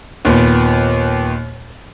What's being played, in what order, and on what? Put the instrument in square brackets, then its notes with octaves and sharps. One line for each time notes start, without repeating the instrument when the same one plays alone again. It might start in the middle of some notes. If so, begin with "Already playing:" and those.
[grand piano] D#2 A#2 B3